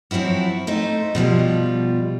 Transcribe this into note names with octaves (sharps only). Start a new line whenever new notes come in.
F3 F#3 C4 E4 F#4
A3 D#4 C5
B2 F3 G3 F4